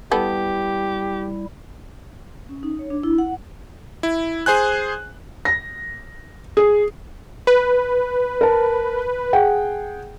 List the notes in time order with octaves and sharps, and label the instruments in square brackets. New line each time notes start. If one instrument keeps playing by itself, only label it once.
[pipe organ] G3 E4 [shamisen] B3 A4 [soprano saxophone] G4
[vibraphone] C#4
D#4
C#5
D4
E4
F#5
[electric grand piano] E4
G#4 C5 G#5 F#6
[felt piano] A#6
G#4
[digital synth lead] B4
[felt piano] A#4 A5
G#4 F#5 G5